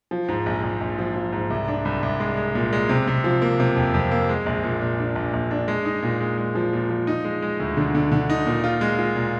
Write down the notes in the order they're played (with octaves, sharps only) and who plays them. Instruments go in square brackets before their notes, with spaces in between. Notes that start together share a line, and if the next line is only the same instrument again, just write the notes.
[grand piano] F3
G#2
A#1
A#1
A#1
F3
F3
G#2
C2
D4
C2
C2
G#3
G#3
A#2
G#3
C3
C3
F3
A#3
C3
F2
F2
A#3
G#3
A#1
A#2
A#2
D4
A#1
A#1
D4
G#3
D#4
A#2
G#3
G#3
F3
A#2
F3
D#4
G#3
G#3
D2
D3
D3
D3
D#4
A#2
F4
G#3
F4
A#2